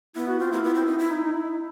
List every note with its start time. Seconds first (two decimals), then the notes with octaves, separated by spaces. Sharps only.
0.16 B3 E4
0.28 F#4
0.39 C4 F4
0.51 A#3 E4
0.63 B3
0.74 C4
0.86 D#4
0.98 E4
1.10 D#4
1.24 D#4
1.33 E4